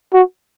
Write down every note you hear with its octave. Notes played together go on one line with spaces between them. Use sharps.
F#4